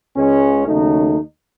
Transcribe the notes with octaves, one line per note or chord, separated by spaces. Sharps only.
C#2 C#3 G#3 C#4
D#2 C#3 F#3 A3 D#4